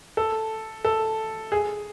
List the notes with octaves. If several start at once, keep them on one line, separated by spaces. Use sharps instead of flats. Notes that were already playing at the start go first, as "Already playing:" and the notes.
A4
A4
G#4